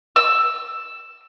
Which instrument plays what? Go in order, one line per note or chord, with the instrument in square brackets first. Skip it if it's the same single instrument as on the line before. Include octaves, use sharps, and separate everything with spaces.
[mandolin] E6